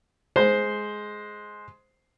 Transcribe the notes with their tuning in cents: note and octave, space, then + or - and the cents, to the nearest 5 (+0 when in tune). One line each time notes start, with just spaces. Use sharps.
G#3 +10 C5 +0 C6 +0